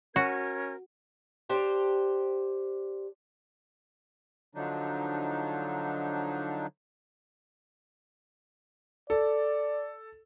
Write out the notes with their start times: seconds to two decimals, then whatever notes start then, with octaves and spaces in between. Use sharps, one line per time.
0.16 C#4 F#4 A#4 G#6
1.49 D4 G4 C5
4.55 D3 F3 F#3 D4 D#4
9.10 A4 D5